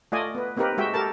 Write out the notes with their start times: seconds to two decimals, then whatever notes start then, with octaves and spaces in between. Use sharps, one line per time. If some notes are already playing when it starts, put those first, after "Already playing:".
0.12 A3 F4 D5 D#5 G#5
0.35 B3 B4
0.57 A#3 C4 D#4 G4 A#4 B4
0.78 G#3 F#4 E5 G5
0.94 G4 A4 A#4 A5